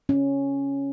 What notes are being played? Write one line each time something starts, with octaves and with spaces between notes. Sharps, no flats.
C#4